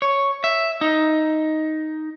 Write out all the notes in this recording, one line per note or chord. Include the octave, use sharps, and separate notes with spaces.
C#5
E5
D#4